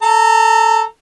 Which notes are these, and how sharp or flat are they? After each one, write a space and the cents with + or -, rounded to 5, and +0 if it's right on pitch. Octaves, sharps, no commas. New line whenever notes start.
A4 +0 A#5 -25